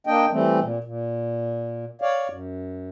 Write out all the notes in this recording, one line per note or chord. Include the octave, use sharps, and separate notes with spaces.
A#3 D4 D#5 G5
E3 G3 A3 C4
A#2
A#2
C#5 D5 F5
F#2